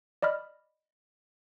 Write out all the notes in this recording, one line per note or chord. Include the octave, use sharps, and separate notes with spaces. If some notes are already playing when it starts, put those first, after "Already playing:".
D5 D#5 B5 F6